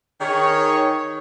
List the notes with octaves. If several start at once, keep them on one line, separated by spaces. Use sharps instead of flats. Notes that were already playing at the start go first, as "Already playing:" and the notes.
D#3 G#4 C#5